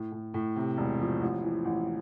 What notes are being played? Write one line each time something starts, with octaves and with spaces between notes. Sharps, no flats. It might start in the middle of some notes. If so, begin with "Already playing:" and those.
Already playing: A2
A2
A2
C3
E1
F3
A1
E3
A1